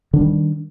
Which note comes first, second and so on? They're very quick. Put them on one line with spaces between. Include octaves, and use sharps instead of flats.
D3 D4 G3 D#3